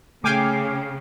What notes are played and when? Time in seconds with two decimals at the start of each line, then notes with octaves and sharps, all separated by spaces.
0.24 C#3 A3 G5 G#5 D6 F6 C7